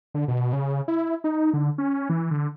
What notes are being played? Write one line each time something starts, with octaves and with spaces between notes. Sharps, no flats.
D3
B2
C#3
E4
D#4
D3
C#4
E3
D3